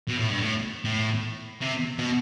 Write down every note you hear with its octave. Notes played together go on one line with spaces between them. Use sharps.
B2
A2
G2
A2
A2
C3
B2